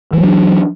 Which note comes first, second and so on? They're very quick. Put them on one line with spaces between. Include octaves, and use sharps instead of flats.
E3 G#3 F#3 D4